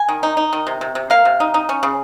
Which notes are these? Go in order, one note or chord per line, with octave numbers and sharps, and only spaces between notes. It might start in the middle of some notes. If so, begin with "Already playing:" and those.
Already playing: G#5
D#3
D#4
D#4
D#3
C3
C3
C3
A#3 F5
C3
D#4
D#4
C#4
C#3